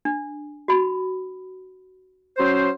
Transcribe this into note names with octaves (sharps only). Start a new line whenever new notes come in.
D4
F#4 B5
F#3 C#4 C5